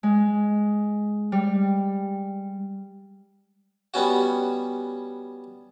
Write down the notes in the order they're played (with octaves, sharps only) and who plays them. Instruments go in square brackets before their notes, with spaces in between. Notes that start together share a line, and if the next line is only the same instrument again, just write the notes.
[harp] G#3
G3
[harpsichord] G3 B3 C#4 F#4